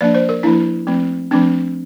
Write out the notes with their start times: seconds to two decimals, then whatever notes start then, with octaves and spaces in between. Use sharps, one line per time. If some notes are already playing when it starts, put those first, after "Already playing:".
0.01 F3 A#3 D4 D5
0.14 C5
0.29 A#4
0.43 F3 A#3 D4 E4
0.87 F3 A3 C4
1.31 F3 A3 C4 D4